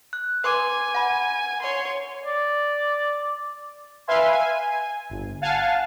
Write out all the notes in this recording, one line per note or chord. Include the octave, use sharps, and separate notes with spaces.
F#6
B4 G#5 C6 D6
F#5 B5
C#5 C6
D5
B4 E5 F5 G#5 C6
G#5
G1
F5 F#5 G#5 A5